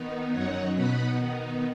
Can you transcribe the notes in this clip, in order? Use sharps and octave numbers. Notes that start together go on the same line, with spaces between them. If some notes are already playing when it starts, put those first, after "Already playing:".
Already playing: D#3 B3 D#4
F#2 F#3 D#4 C#5 F#5
B2 B3 D#4 F#5 B5
D#3 B3 D#4